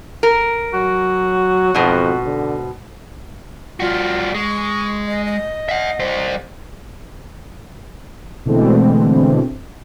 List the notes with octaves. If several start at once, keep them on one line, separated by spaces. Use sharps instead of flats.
A#4
F#3 F#4
F2 G#2 B2
D3
G3 F4 F#4
G#3 C#6
D#5
D#5
E5 F#5
G3 C5
B2 D3 E3 G#3 A3 C4